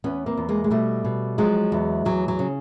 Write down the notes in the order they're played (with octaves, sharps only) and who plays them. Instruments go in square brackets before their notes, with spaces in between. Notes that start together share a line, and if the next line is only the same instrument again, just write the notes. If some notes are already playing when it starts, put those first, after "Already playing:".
[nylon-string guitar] E2 B3 C#4
A#3 C4
E2
G#3 A#3
G#3
B2 G3 A3
B2
F3 F#3 G#3
E2
E2 F#3
F#3
C#3